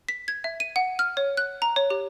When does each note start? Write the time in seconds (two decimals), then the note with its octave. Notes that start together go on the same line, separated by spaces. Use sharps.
0.09 B6
0.28 G#6
0.44 E5
0.60 D#7
0.76 F#5
0.99 F6
1.17 C#5
1.37 F#6
1.62 A#5
1.76 C#5
1.90 G4